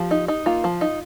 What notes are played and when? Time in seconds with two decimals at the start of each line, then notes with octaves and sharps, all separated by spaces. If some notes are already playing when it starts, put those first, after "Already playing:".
Already playing: F3 G4
0.11 D#4
0.28 D#4
0.46 A#3 F4
0.64 F3
0.81 D#4